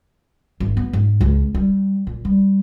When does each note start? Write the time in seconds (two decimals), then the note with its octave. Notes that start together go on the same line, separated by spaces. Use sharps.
0.60 G#1
0.77 B3
0.93 G#2
1.21 C#2
1.55 G3
2.07 A#2
2.25 G3